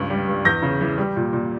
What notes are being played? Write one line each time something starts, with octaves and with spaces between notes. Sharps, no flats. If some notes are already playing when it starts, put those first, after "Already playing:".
Already playing: C#2 G2
G3
G2
E2 G6 A#6
C#3
E3
G3
A#2
A#2